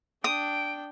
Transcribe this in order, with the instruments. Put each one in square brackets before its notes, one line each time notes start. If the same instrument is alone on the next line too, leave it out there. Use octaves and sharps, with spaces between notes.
[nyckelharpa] D4 G5 [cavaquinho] D#6 [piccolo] D7